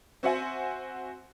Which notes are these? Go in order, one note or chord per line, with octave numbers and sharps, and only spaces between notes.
C4 F#4 C5 E5 F#5 G#5